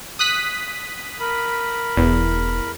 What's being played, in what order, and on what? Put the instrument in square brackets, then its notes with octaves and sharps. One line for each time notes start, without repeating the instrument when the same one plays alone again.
[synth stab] D#6 F#6 B6
[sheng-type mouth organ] A#4 B5
[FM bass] E1 [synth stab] E2